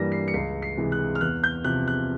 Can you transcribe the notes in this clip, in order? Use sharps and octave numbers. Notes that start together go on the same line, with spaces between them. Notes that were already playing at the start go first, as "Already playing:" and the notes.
Already playing: G2 E3 G3 A#3 A#6
C7
C#7
C#2 C7
C7
C3 E3 G#3
F#6
F6
E2 F#6
G6
C3 F3 F#6
F#6